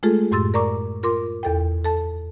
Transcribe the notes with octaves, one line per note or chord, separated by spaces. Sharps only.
G#3 A3 F4 G#4 A4
F#2 A2 G4 C6 E6 A6
A#4 D5 A#5 C#6 D6
F4 A#4 C6 D6
E2 A4 G5
A4 A5